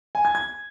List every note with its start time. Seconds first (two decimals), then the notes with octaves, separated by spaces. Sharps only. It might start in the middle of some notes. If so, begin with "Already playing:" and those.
0.15 G#5
0.25 G#6
0.35 G#6